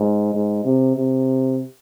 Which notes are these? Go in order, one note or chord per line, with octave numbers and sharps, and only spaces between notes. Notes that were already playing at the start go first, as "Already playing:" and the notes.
Already playing: G#2
G#2
C3
C3